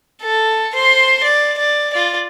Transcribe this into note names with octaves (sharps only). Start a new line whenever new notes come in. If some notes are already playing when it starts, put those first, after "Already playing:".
A4
C5 C6
D5
D5
F4 D5